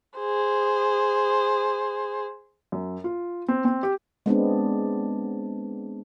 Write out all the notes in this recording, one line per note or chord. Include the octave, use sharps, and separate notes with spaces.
G#4 C5
F#2
F4
C4
C4
G4
G#3 B3 C4 D4